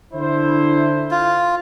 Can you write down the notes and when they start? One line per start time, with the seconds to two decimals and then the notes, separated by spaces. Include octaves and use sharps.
0.14 D3 E4 C5
1.11 F4